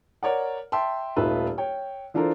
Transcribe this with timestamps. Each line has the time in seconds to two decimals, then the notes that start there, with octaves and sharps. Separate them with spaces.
0.23 A#4 C#5 D5 F#5
0.72 E5 G5 A5 C6
1.16 D#1 A3 D#4 F4 B4 E5
1.58 C#5 G5
2.14 E3 D4 F4 A4 A#4 C5